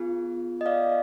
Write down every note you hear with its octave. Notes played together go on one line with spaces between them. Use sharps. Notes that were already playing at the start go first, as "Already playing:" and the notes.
Already playing: B3 F4 G#4
D#5
D5 F5